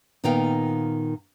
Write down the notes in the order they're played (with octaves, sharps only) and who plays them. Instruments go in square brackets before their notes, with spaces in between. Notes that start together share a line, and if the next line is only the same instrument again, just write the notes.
[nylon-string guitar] A#2 D#3 B3 D#4 F5 G5